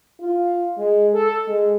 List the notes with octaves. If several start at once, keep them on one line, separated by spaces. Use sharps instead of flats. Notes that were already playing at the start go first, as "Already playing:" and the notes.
F4
G#3
A4
G#3